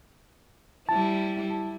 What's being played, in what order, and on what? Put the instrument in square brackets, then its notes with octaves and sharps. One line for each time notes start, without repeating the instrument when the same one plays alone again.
[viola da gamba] G3 E4 [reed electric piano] A5